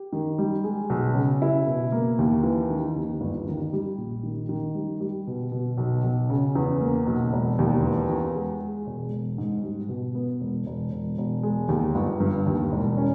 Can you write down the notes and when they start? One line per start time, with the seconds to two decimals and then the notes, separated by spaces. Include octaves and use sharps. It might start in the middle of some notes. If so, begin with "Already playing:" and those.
Already playing: G4
0.13 D#3
0.38 G3
0.64 G#3
0.90 B1
1.15 C#3
1.42 E4
1.67 B2
1.92 A#3
2.19 D#2
2.43 E3
2.70 D#3
2.96 D#2
3.21 G1
3.47 D#3
3.73 G3
3.98 A#1
4.23 D#3
4.49 D#3
4.75 G3
5.00 G3
5.27 B2
5.52 B2
5.77 B1
6.04 B1
6.30 C#3
6.55 E2
6.81 A#3
7.07 B1
7.33 E1
7.59 D#2
7.83 E2
8.09 E2
8.35 G#3
8.61 G#3
8.87 E1
9.13 E1
9.38 G#2
9.63 G3
9.89 B2
10.15 B3
10.41 E1
10.66 E1
10.92 E1
11.18 E1
11.43 G#3
11.69 D#2
11.95 G1
12.20 G2
12.46 D#2
12.72 E1
12.97 C#4